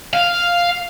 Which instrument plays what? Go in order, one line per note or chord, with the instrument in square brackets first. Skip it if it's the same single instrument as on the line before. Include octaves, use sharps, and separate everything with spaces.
[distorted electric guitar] F5